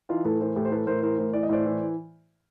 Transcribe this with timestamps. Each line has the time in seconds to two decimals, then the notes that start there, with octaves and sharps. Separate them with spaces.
0.09 E3 D#4 F4
0.25 A2 A4 B4
0.40 E3 A#4 C5
0.56 A2 G4 A4
0.65 C5
0.71 E3 A4 B4
0.87 A2 A#4 C5
1.03 E3 A#4 C5
1.18 A2 A#4 C5
1.33 E3 D5
1.43 D#5
1.49 A2 C5 D5
1.66 E3